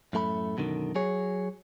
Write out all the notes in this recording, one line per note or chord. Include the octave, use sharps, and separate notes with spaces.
F#2 A2 A3 A#5 B5
F#2 B2 D3 D#3
F#3 G#4 C#5